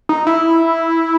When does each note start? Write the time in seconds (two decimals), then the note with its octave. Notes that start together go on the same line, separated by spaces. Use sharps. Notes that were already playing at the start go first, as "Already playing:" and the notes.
0.09 D#4
0.27 E4